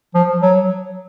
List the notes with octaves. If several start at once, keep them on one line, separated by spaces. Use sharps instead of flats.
F3
F#3